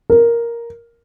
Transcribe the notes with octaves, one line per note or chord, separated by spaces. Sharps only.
A#4